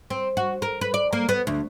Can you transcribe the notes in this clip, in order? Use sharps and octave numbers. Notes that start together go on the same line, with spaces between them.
C4
F#4
A#4
B4
D5
A#3
B3
D2